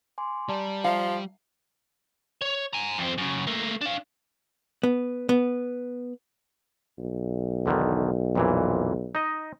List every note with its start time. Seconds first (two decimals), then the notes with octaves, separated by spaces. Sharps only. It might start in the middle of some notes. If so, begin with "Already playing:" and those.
0.18 G#5 C6 D6
0.49 G3 D5 A5 A#5
0.84 F3 F5
2.42 C#5
2.73 G#5 A#5
2.98 F2 C4
3.18 F#2 C#3
3.47 A3 A#3
3.81 D4 F5
4.83 B3
5.29 B3
6.98 B1
7.66 E2 D3 D#3
8.35 F2 A#2 E3
9.15 D#4 D#5